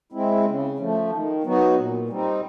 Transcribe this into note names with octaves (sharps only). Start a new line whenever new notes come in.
G#3 C4 E4
C#3
F3 A3
D#3
F#3 B3 D#4 F#4
A#2
G3 C4 D#4